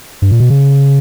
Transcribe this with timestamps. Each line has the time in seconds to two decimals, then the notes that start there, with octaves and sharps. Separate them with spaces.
0.22 G2
0.31 A#2
0.40 B2
0.50 C#3